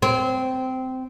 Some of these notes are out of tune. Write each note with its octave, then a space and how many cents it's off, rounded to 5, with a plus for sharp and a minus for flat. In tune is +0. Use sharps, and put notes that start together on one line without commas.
C4 -15